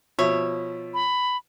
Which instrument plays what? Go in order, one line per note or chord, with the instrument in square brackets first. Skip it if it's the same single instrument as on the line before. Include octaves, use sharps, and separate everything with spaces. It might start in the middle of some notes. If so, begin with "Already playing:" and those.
[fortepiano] B2 F3 E5 [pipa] C#5
[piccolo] B5